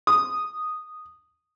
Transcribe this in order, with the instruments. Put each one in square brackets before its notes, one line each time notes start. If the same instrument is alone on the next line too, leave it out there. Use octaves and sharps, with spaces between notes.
[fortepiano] D#6